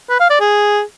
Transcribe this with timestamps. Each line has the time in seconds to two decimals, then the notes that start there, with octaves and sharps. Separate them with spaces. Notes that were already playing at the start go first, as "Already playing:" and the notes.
0.10 B4
0.20 F5
0.30 D5
0.40 G#4